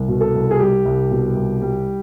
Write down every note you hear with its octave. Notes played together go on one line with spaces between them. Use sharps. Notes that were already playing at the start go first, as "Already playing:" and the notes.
Already playing: C2
B2
A4
C2
G#4
G3 G4
C2
B2
C2
G3